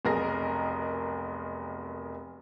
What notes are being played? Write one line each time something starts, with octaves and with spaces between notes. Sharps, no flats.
F1 B1 G#4 A#4 A#5 A#6